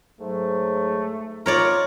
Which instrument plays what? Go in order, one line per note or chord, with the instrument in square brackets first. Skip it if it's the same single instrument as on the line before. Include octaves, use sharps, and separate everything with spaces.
[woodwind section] G#2 F#3 [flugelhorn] A3
[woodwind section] D#3 A#3 F4 [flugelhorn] D#4 [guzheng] A#4 C#5 D5